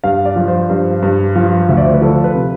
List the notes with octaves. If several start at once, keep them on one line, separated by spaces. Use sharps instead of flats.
G2 F5
D5
F3
C5
G2
G2
F3
D2 E5
D5
C5
B4
F3 A4
B4
C3